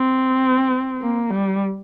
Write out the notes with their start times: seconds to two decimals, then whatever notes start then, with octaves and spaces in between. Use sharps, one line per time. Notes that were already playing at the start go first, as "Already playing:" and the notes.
Already playing: C4
1.02 A#3
1.30 G3